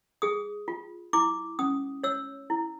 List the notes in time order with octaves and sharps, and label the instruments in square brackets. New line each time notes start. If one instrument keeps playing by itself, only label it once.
[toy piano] G#4 D#6
F4
E4 D6
C#4 D#6
C#5 E6
E4